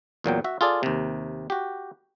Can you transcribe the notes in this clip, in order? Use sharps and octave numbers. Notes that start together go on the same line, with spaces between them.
E2 A#2 F#3 G5
F#4 E5
F4 G#4 A4 D5
D#2 C3
F#4 G4